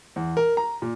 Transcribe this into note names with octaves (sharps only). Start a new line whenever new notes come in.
E2
A#4
A#5
A#2